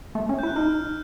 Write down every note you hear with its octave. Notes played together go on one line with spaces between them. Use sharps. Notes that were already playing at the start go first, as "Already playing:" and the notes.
A3
C#4
G6
E4
F#6
D#4 F6